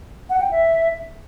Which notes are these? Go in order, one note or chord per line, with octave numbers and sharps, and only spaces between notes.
F#5
G5
E5